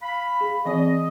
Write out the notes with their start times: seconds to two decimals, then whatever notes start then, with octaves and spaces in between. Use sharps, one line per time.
0.02 F5 B5
0.41 G#4
0.65 E3 C4 D5 D#5